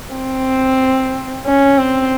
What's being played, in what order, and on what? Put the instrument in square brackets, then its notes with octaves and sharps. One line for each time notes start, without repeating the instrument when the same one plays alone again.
[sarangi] C4
C#4
C4